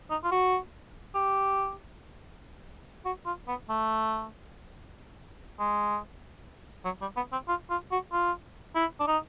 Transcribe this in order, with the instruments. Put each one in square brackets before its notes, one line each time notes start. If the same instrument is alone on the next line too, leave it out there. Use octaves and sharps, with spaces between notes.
[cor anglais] D#4
F4
F#4
G4
F#4
F4
B3
A3
G#3
F#3
G3
B3
C4
F4
F4
F#4
F4
E4
D4
D#4